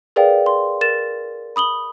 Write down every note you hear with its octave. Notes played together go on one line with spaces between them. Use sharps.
G#4 A#4 B4 D5 F5 G5
C6
A#4 A6 E7
B5 D#6 F#7 G7